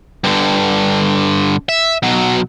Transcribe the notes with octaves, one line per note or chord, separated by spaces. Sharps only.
G2 D3
E5
B2 F#3